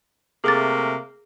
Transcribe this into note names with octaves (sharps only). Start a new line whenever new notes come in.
C3 A3 A#3 G#4 D6 A6